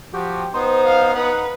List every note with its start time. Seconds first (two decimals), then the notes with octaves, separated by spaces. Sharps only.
0.14 F3 F#4 G4
0.54 B3 D#4 C5
0.84 F5
1.16 D#4 B4 F#5